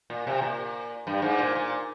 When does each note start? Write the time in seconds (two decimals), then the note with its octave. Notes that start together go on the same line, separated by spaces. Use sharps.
0.10 A#2
0.27 C3
0.42 A#2
1.07 G2
1.22 G#2
1.39 A#2
1.55 A#2